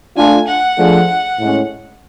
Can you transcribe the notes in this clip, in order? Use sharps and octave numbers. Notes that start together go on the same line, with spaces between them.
A3 D4 F4 G#5
F#5
F3 A3 D4 G#4
A2 G#3 C#4